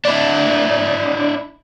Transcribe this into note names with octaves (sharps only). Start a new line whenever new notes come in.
D4 E4